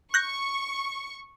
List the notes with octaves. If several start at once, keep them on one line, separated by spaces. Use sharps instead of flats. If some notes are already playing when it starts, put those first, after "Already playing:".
C#6 F#6 G6 A#6